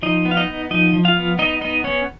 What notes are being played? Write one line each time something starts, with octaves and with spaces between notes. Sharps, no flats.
F3 D#4 D#5
B3
F5
D#4 D#5
B3
F3 D#4 D#5
F3
F4 F5
B3
B3 D#4 D#5
B3 D#4 D#5
B3 C#4 C#5